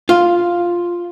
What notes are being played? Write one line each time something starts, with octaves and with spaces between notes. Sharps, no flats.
F4